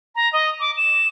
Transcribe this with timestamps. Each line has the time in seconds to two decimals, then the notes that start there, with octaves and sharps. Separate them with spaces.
0.16 A#5
0.33 D#5
0.60 D6
0.77 E7